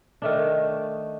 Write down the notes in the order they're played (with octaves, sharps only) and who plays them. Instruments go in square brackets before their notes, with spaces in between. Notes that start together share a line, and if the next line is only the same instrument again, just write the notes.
[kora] D#3 A3 D4